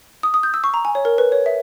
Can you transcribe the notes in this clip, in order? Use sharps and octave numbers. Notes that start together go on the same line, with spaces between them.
D#6
D#6
G6
E6
C#6
A#5
G#5
C#5
A#4
B4
C#5
E5